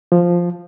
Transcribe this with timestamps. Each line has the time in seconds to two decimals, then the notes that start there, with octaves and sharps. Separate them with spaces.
0.12 F3